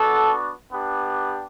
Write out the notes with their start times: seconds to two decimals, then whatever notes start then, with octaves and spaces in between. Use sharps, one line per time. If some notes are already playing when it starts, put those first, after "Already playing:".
Already playing: B3 D4 F#4 A4
0.70 B3 D4 G4